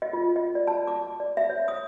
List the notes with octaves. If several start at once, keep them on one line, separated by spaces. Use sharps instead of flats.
D#5
F4
D#5
D5
A5
D6
D5
E5
C#5
D#6